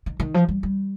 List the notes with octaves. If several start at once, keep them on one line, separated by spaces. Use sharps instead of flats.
D#3
D#3
F3
G3
G3